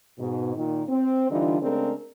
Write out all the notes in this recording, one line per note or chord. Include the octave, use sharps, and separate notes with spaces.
G#2 B2
A#2 D#3
C4
D3 E3 G3 D4 D#4 F4
C#3 G#3 A3 C4 D4 A#4